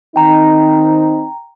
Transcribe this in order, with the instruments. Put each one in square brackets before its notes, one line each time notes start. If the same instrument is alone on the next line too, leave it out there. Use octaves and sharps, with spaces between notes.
[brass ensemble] D#3 C4 D#4 [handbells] G5 A#5